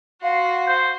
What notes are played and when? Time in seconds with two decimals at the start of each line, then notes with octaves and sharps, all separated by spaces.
0.23 F#4 F5 C6
0.68 C5